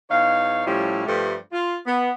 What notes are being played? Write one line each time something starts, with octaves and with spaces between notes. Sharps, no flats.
E2 D#4 C#5 F5
A2 F3 G3 C#4 E4
G2 F3 G3 A3
F4
B3